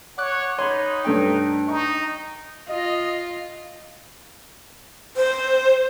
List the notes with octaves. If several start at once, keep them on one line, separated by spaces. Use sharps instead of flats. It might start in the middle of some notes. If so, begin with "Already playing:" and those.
C#5 F#5 D6 F#6
D#4 C#5 B5 C6
G2 A3 D4 C#5 G5
D#4 C#6
F4 D#5
C5